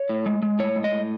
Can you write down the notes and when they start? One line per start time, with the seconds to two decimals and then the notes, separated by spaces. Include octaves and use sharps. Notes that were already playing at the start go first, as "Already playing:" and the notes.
Already playing: C#5
0.09 A2
0.26 G#3
0.42 G#3
0.59 A2 C#5
0.76 G#3
0.84 D#5
0.92 A2